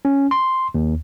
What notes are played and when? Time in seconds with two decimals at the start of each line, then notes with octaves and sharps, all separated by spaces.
0.05 C#4
0.31 C6
0.75 D#2